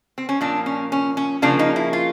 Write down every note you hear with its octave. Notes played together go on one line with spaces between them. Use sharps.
C4
C#4
A#2 F3 A#3 D4
C#4
C#4
C#4
C#3 F3 A#3 D4
D#4
E4
F4